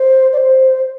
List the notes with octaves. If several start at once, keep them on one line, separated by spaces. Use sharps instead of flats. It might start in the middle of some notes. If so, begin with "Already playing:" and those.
Already playing: C5
D5
C5